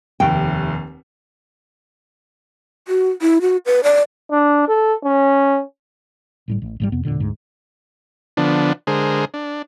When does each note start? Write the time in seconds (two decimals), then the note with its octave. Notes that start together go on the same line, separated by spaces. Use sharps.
0.20 F1 D#2 G5
2.88 F#4
3.22 E4
3.41 F#4
3.66 B4
3.84 D5
4.31 D4
4.69 A4
5.04 C#4
6.48 G1 A2 G3
6.62 A1
6.80 G#1 G#2 G3
6.92 F2 C3 B3
7.05 E1 A#1 A#2 D3
7.20 D2 G#2
8.37 D3 F3 B3 D4
8.87 D3 G#3 G#4 A#4 C5
9.34 D4